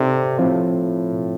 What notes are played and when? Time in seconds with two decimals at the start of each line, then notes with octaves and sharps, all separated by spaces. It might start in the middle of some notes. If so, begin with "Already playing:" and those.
Already playing: C3 C4 D#4 A4 D5
0.39 A2 F3 C4 F4